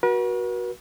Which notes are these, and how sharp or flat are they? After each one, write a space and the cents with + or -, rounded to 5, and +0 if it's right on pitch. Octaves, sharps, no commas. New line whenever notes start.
F#4 +0 B4 -45